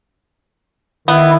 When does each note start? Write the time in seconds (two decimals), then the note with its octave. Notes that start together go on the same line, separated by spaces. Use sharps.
1.08 D#3 B3 E4